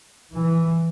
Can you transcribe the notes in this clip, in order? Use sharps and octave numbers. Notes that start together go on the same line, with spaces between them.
E3